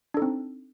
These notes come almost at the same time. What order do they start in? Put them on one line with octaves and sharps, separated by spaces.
D4 A4 D#4 C4